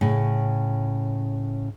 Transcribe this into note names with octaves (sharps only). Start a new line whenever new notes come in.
A2 C#3